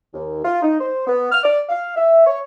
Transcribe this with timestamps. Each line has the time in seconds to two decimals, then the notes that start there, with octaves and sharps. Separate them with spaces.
0.14 D#2
0.45 F4
0.62 D#4
0.80 C5
1.07 B3
1.32 F6
1.44 D5
1.69 F5
1.96 E5
2.26 C#5